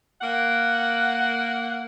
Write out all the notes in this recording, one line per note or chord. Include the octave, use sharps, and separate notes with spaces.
A#3 F#5